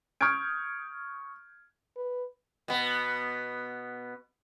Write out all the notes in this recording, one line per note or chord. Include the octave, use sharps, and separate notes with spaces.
C#6 D#6 F6 G6 G#6 D7
B4
B2 B3